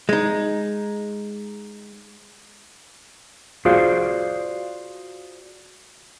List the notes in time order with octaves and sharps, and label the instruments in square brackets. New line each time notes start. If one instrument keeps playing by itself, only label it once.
[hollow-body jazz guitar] G#3 D#4
[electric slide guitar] F4 F#4 G#4 C5 D5 F5